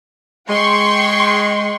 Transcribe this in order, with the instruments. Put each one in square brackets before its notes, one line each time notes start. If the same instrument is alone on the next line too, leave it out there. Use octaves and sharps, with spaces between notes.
[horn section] G#3 [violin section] G5 C6 C#6